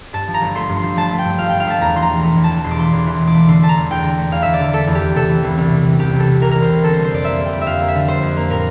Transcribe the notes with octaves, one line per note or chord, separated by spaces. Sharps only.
G2 A5
F3
A#5
G1
A3 C6
G2
C6
F3
G1 A5
A3
G5
G2
F3 F5
G1 G5
F5
A3 A5
E2 A#5
E3 C6
A#5
E1
A3 A#5
E2
A5
E3
E1 C6
D6
A3 C6
E2
E3 C6
E1
D6
A3
D3 C6
A3 A5
A#5
E2
E2 G5
D3
A3
E2 F5
E2 E5
D5
D3
A3 A4
E2
G4
E2
C3 A4
E3
C2
C2
C3
E3
C2 G4
C2
A4
C3
E3 A#4
C2 A#4
C5
C2
D3 A4
G3 C5
C5
F2 D5
A#3 E5
D3
G5
G3
E5
F2 F5
A#3
E5
D3
G3 C5
F2
A#3
A2 A#4